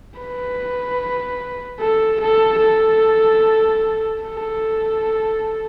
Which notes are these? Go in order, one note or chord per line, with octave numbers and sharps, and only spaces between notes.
B4
A4
A4
A4
A4